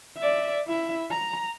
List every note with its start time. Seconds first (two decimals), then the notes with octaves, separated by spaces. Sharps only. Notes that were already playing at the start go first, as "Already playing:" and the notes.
0.18 D5 E5
0.68 E4 E5
1.11 A#5